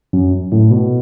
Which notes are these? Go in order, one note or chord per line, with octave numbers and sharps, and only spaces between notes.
F#2
A2
B2